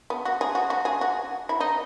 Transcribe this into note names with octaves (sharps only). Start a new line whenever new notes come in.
B3
F#4
G#4
F#4
F#4
G#4
F#4
E4
D#4